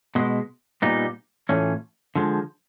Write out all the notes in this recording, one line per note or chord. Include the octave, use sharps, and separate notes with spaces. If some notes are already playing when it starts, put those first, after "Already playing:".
B2 G#3 B3
A#2 G3 B3 D#4
A2 E3 A3 C#4 F4
D3 F3 G#3